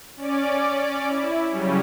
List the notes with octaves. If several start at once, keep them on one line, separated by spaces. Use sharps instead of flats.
C#4 D5 D6
E4
C#3 F#3 G3 C#4